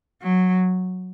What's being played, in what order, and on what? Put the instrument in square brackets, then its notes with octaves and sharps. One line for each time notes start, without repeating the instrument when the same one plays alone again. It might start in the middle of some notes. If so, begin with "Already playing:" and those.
[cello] F#3